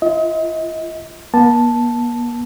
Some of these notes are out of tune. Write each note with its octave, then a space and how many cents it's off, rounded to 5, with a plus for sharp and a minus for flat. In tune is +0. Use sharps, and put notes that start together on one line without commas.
F4 -30 D#5 +35
A#3 +45 A5 +0